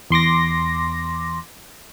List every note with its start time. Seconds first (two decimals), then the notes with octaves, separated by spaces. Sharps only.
0.10 E2 C6 D6 A#6